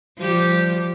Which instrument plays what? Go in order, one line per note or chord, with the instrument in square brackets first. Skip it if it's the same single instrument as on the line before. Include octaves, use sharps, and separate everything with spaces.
[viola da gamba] F3 G3 G4